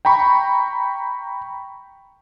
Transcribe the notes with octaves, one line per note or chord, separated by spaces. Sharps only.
G5 A#5 B5 C#6